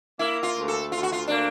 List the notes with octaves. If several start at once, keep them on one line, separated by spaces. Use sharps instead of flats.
A#3 E4
F4
D2
A4
D2 F4
F#4
F4
A#3 D4